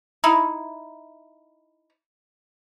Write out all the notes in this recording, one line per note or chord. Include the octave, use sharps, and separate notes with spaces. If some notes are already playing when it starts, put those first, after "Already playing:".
D#4 E4